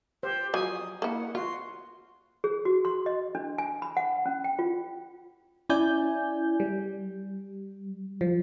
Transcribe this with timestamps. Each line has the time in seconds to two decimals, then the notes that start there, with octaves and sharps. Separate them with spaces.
0.23 G4 C5
0.54 F3 F#3 G#5 D#6
1.02 A#3 E4 F#5
1.35 F4 F#4 C6
2.44 G#4
2.65 F#4
2.85 C6
3.06 D#5
3.35 D4
3.58 G#5
3.82 B5
3.97 F#5
4.26 C#4
4.44 G5
4.59 F4
5.69 C#4 E4 D5 G#5 G6
6.60 G3
8.21 F3